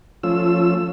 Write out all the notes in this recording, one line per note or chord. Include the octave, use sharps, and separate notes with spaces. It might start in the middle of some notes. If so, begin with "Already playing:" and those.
F3 A3 C#4 F4 E6